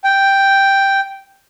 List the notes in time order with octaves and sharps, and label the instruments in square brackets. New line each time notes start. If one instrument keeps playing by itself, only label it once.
[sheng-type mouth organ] G5